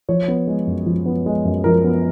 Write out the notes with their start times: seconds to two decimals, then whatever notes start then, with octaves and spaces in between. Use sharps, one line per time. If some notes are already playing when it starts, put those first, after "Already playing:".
0.09 F3 C#5
0.28 B3
0.47 G#3
0.67 F#2
0.86 F3
1.06 B3
1.26 G#3
1.45 F#2
1.64 F3 A#4
1.84 B3